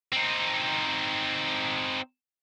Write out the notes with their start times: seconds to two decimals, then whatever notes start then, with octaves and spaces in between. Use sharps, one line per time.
0.12 C4 D#4